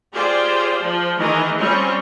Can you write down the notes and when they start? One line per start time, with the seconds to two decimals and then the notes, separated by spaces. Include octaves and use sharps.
0.13 F4 G4 G#4 C5 D5
0.82 F3
1.18 D#3 E3 G#4 D#5
1.58 G3 C4 C#4 F4